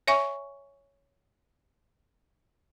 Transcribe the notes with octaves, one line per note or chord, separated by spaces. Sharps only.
C#5 E5 G#5 C#6